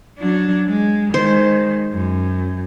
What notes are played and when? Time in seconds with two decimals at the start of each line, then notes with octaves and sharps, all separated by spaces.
0.19 F#3 D4
0.68 G#3
1.14 D#3 G#3 C5
1.93 F#2